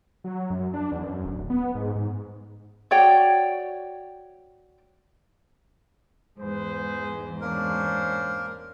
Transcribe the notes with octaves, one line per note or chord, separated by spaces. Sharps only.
F#3
F#2
D4
E2
F#2
D1
B3
G#2
G#2
F#4 C#5 D5 G5
E2 G#2 G#4 B4 C5
A#3 C#4 D4 A#4 C5